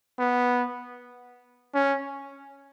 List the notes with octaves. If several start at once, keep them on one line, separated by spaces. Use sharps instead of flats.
B3
C#4